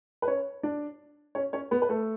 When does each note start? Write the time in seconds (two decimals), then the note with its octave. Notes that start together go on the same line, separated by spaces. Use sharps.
0.22 B4
0.28 C#4 C#5
0.63 D4 D5
1.35 C#4 C#5
1.53 C#4 C#5
1.71 B3 B4
1.82 B4
1.89 A3 A4